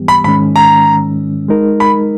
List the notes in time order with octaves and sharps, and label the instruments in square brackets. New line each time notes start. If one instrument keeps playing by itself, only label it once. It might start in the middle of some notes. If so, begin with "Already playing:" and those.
Already playing: [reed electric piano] G#2 E3 G3 B3 G4
[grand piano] B5
[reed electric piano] G#2 D#3 G#3 C#4 [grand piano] B5
[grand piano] A#5
[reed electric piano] G#3 D#4 A#4
[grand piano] B5